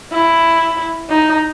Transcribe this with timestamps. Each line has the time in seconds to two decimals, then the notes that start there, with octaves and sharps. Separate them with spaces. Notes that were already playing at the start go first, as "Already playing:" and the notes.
0.13 E4
1.10 D#4